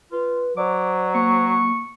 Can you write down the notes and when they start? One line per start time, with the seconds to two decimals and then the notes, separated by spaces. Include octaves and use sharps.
0.12 F4 B4
0.57 F#3 C5 D5 D6
1.15 A#3 C#6